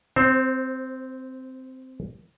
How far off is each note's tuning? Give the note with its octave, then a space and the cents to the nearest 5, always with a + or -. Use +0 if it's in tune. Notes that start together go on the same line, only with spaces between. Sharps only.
C4 -10 C5 +20